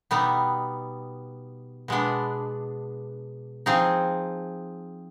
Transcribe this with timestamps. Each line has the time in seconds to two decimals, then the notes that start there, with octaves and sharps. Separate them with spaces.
0.11 B2 G3 B3 D#4
1.88 B2 G#3 B3 D4
3.66 F3 C4 D#4 G#4